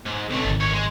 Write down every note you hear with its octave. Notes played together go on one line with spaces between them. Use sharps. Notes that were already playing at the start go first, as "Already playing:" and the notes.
G#2
B1 A3 C4 C#4
G#1 D#3
A#2 C#5
G#3